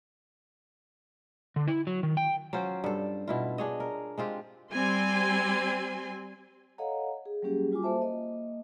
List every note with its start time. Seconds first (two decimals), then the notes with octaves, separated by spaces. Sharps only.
1.56 D3
1.68 E4
1.87 F#3
2.03 D#3
2.17 G5
2.53 F#3 C#4 F4 C5
2.84 G2 A4
3.28 B2 E4 F4
3.58 D4 G#4 C#5 D#5
3.80 A#4
4.18 G#3 C4 F4 G4
4.72 G3 C4 G#5 C6
6.78 A4 C#5 D#5 F5 F#5 A#5
7.26 G#4
7.42 F#3 G3 A#3 C#4 G4 G#4
7.72 G3 F4 F#4 G#5 D6
7.83 A#3 A4 C5 E5 A5
8.02 A#3 D#5